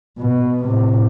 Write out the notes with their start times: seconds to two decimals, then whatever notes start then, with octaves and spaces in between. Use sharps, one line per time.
0.19 B2
0.64 A2 C3